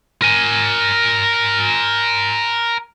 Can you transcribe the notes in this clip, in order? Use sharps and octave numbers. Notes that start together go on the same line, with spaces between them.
A#4 G#5